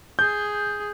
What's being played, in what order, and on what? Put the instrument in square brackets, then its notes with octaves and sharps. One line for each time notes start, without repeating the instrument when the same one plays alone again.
[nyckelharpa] G#4 [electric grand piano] G6